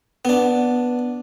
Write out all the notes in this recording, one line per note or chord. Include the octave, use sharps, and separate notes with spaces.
B3 D4